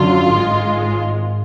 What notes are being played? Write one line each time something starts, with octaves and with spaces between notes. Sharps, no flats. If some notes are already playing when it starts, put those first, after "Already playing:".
Already playing: F#2 D3 F#3 F4
G#1 G#2 G#3